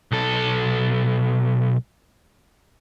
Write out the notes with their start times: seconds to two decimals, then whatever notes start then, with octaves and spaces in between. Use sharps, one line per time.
0.11 B1 A4